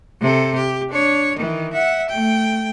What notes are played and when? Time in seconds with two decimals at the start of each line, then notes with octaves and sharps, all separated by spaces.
0.21 C3 A4
0.55 G4
0.90 D4 C#5
1.37 D#3 E3
1.73 E5 F#5
2.09 A3 G5